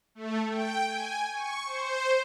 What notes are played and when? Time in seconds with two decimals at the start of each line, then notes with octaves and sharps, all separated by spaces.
0.15 A3
0.49 G5
0.88 G#5
1.33 C#6
1.65 C5